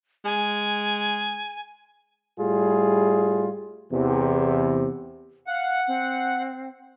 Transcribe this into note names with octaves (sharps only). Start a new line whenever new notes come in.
G#3 G#5
A2 G3 F4 G#4
E2 C3
F5 F#5
C4